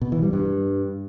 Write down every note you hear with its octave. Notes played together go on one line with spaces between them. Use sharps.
B2
E3
G3
G2